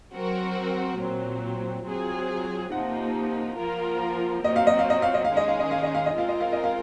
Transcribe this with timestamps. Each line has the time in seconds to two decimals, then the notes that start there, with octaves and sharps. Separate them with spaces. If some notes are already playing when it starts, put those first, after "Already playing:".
0.13 F#3 C4 F#4 A#4
0.99 A#2 F#3 C4
1.86 F#3 C4 F4 G#4
2.72 C3 F3 A#3 D#4 F#5
3.58 F3 A#3 F4 A#4
4.44 A#2 F#3 C4 D#5
4.56 F5
4.67 D#5
4.79 F5
4.90 D#5
5.02 F5
5.14 D#5
5.25 F5
5.30 D#3 G#3 C#4 G#4
5.37 D#5
5.48 F5
5.59 D#5
5.71 F5
5.83 D#5
5.95 F5
6.06 D#5
6.17 G#3 C4 F4 A#4 F5
6.29 D#5
6.41 F5
6.53 D#5
6.64 F5